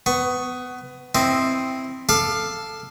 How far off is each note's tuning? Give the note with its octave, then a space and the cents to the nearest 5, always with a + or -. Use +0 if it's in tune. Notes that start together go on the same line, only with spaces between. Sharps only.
B3 +20 C#6 +0
C4 +0 E4 +0 D#5 +0
A4 +0 F5 +0 D6 +30